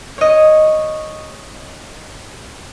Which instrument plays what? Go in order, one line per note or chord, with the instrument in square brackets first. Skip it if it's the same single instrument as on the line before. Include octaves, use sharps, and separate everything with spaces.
[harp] C#5 D#5